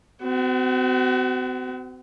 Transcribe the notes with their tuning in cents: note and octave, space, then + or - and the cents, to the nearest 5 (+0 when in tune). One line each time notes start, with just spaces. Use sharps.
C4 -40 F#4 +25